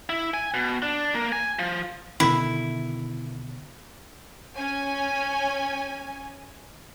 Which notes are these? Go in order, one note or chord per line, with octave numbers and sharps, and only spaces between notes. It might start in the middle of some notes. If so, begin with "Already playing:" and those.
E4
G#5
B2
D4
A#3
G#5
F3
B2 D3 D#3 E4
C#4 G#5